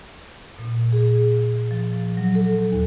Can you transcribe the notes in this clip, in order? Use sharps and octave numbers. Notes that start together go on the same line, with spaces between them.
A#2
G#4
F3
F#3
A4
D#2